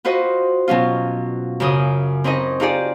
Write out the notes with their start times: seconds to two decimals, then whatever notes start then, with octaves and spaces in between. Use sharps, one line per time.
0.05 F4 F#4 B4 C5 D#5
0.68 B2 F#3 C#4 F4
1.60 F#2 C#3 D#6
2.24 C4 C#4 D#4 B4 D#5
2.60 D#4 F4 G4 G#4 D5